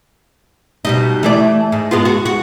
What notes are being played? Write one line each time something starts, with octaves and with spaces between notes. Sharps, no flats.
B2 G3 D#4
E3 A3 D5
G#2
G#3 B3 F4
F#4
F#4